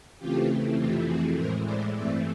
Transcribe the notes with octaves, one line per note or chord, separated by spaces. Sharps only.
C#3 E3 A3 C4 F4 G4
F2 C3 E3 A3 C4 F4 G4
F#4 G#4
A2 E3 G#3 A#4 C5
C5 D5
G2 E3 A3 C4 D5 E5